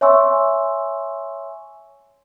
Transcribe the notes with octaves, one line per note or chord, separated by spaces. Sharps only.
C#5 E5 G#5 C6 C#6 E6